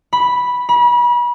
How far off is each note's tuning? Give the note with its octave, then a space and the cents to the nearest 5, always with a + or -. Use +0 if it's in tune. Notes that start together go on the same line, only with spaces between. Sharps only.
B5 -5
B5 -35